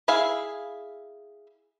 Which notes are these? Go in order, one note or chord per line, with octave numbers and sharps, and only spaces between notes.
E4 G#4 E5 F5